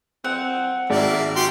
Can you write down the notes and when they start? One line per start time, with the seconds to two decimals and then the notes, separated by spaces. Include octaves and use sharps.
0.24 C4 F#5
0.90 G#1 A#3 D5 E5
1.36 F#4 G4 C6